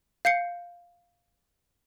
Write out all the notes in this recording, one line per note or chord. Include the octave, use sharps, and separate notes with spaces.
F5 G6 C7 C#7